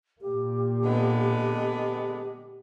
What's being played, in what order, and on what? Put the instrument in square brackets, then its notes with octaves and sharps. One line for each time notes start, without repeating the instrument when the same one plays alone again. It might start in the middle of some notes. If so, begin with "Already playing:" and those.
[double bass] A#2 A#3 [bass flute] G4
[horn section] D3 G#3 B3